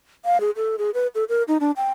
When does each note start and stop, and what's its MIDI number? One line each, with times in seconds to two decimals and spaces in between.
0.25 0.40 77
0.40 0.51 68
0.56 0.76 69
0.78 0.90 68
0.94 1.07 71
1.15 1.24 69
1.29 1.43 70
1.48 1.58 63
1.60 1.71 62
1.77 1.92 79